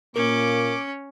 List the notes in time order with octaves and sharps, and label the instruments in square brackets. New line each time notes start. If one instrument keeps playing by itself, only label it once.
[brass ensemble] A#2 A#3 [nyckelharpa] C#4 [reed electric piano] A#4 [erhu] D6